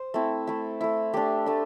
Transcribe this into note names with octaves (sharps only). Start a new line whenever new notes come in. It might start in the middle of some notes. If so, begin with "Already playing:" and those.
Already playing: C5
A3 C4 E4
A3 E4
A3 E4
A3 D4 G4
A3 D4